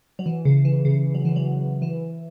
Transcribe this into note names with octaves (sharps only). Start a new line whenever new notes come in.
F#3
E3
C#3
E3
C#3
F#3
E3
F#3
E3